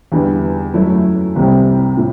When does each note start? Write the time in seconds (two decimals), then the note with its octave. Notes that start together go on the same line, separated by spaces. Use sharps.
0.12 E2 D3 G3 B3 E4
0.74 F#2 F#3 A3 E4
1.35 C2 C3 E3 G3 C4
1.97 A2